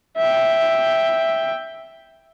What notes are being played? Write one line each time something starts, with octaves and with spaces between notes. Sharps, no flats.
E5 G5